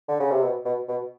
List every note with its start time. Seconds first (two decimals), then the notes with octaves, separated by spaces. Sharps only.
0.08 D3
0.20 C#3
0.31 C3
0.43 B2
0.65 B2
0.88 B2